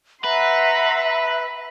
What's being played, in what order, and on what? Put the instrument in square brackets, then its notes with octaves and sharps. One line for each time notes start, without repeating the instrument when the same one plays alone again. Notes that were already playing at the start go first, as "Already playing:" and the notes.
[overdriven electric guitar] B4 [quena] E5 [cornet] F#5 [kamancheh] A#5 C6